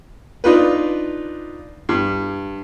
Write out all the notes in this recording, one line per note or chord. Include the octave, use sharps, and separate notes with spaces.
D4 D#4 F4 B4
G2